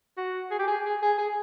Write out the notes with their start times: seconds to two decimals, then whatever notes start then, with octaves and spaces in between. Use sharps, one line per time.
0.17 F#4
0.51 G#4
0.59 G4
0.67 G#4
0.85 G#4
1.03 G#4
1.18 G#4